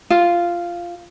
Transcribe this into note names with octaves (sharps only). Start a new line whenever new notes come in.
F4